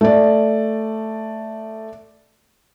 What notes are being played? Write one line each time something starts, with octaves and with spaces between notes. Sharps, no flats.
A3 D5